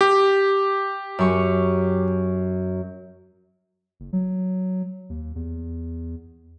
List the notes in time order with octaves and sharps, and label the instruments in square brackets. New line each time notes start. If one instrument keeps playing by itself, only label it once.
[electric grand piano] G4
[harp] F#2 C#6
[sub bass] F#1
F#3
D#2
E2